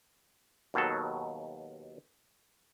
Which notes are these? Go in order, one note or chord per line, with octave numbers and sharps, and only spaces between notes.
D#2 B2 D#3 F#3 A4